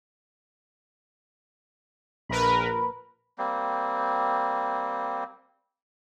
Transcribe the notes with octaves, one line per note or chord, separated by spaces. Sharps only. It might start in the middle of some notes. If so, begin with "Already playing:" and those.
A#1 A#4 B4 B5
G3 A#3 C4